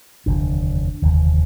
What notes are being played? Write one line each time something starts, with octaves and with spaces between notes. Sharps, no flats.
F1 D#2 D3 D4
F1 D#2 D3